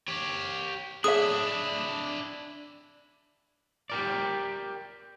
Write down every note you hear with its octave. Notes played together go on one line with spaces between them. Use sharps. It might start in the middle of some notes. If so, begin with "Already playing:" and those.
G4 C#5
D4 E4 G#4 C#5 E5 D#6
G4 A#4 D5